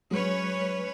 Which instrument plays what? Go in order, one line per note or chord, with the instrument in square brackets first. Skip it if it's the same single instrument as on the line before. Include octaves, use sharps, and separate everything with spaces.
[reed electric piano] F#3 G#3 [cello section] C#4 B4 C#5